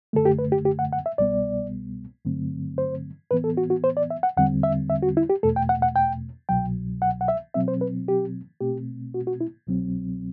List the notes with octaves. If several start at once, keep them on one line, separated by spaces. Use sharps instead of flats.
F#2 D3 A3 A4
G4
B4
G4
G4
F#5
F#5
E5
C2 B2 G3 B3 D5
G2 D3 F#3 A3 C4
C5
A2 E3 B3 B4
A4
F#4
F#4
C5
D5
E5
F#5
E2 D3 G3 C4 F#5
E5
E5
F#4
E4
G4
E2 B2 A3 A4
G5
F#5
F#5
G5
C2 B2 F#3 G5
F#5
F#5
E5
B2 F#3 C4 E5
C5
B4
G4
B2 A3 C4 G4
F#4
F#4
E4
C2 B2 F#3 C4